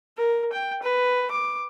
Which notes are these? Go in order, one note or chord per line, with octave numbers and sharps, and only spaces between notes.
A#4
G5
B4
D6